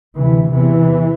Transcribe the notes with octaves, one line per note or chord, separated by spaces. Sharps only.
D2 C3 E3
E2 C3 E3